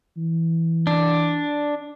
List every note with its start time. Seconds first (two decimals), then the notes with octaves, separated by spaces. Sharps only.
0.17 E3
0.87 D4